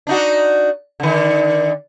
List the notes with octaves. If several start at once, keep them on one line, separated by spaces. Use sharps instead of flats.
D4 D#4 F#4
D3 D#3